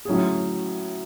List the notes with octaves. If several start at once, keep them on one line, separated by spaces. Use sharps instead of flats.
A2 F#3 C#4 G#4